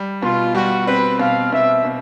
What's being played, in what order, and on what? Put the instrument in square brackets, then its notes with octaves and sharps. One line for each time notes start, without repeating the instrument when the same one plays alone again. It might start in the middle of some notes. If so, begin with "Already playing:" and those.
Already playing: [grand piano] G3
[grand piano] B2 [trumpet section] F4
[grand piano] G3 [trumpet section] F#4
[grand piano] C4 [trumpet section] B4
[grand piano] B2 [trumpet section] F5
[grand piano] B2 [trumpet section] E5
[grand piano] B2